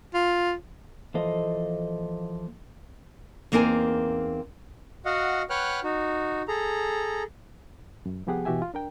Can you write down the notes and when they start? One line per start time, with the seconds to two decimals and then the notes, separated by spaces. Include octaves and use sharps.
0.14 F4
1.14 E3 F3 A#3 A4 C5 D#5
3.52 E2 A#3 C4 D#4 A#4 G#5
5.05 F#4 D#5 F5 F#5
5.50 B4 C#5 F#5 G5 F6 F#6
5.84 D#4 F#4
6.48 G#4 A4 A#5
8.06 F#2
8.26 C2 F3 B3 G4 G#4 F#5
8.45 B2 E3 F#4 G4 E5 G#5
8.62 F4
8.74 D4 A#4 G5